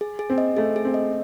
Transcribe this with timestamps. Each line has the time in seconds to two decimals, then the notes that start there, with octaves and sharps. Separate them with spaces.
0.01 G#4
0.19 G#4
0.30 C4
0.38 D#5
0.57 A3 G#4
0.76 G#4
0.85 C4
0.94 D#5